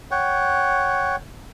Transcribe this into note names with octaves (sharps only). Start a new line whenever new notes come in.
C#5 F#5 G5